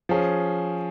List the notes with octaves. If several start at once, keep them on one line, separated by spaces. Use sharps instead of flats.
F3 C#4 G#4